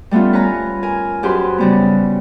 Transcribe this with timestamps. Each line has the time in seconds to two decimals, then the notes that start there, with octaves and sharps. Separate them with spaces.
0.11 G3 A3 B3 C#4 F4
0.33 B4 C#5 G#5 A#5
0.83 A#4 G#5
1.23 F#2 G4 G#4 B4 C5 C6
1.58 C#3 G3 B3